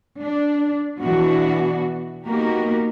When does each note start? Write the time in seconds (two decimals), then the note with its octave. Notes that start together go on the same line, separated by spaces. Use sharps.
0.22 D4
1.02 B2 E3 B3 D4 F#4
2.26 A#3 B3 D#4 F#4 G4 A#4